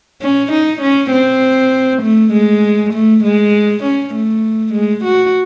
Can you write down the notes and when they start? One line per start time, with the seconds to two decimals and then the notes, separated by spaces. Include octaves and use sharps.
0.21 C#4
0.52 D#4
0.81 C#4
1.11 C4
2.02 A3
2.32 G#3
2.93 A3
3.23 G#3
3.84 C#4
4.14 A3
4.74 G#3
5.04 F#4